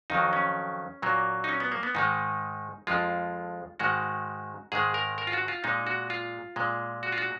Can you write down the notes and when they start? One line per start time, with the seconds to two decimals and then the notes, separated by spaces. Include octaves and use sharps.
0.10 F2 D#3 F#3 D#4
0.33 C#4
1.02 A#2 F#3 A#3
1.44 D#4
1.49 C#4
1.60 B3
1.72 A#3
1.83 B3
1.95 G#2 D#3 G#3 D#4
2.87 F2 F3 G#3 F4
3.79 G#2 D#3 G#3 F#4
4.72 G#2 D#3 G#3 G#4
4.94 A#4
5.18 A#4
5.27 F4
5.33 F#4
5.48 F4
5.64 A#2 G#3 D#4
5.87 F#4
6.10 F4
6.56 A#2 G#3
7.03 F#4
7.12 F4
7.18 F#4